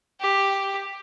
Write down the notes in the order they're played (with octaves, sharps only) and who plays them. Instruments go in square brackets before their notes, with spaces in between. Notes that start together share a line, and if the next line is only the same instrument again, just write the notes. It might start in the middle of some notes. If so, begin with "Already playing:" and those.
[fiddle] G4